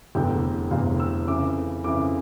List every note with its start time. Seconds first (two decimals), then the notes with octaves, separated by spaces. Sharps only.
0.15 F1 E2 D3 G5
0.71 F1 E2 D3 F5
1.00 E6
1.28 F2 C#3 E3 D6
1.84 F2 C#3 E3 D6